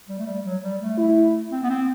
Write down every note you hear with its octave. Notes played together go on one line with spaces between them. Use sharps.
G3
A3
G3
F#3
G3
A3
E4
C4
B3
C4